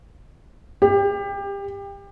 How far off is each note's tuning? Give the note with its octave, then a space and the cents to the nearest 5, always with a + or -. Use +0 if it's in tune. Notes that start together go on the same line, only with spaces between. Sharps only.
G4 +25